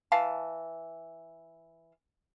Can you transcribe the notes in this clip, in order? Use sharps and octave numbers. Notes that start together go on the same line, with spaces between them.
E3 F5 A5